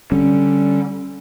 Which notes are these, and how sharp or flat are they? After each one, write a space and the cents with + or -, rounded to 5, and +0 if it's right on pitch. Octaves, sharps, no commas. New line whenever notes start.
D3 +0 G3 -10 C#4 +0